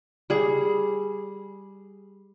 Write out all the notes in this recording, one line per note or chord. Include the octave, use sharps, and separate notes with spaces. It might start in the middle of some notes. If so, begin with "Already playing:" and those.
G3 G#4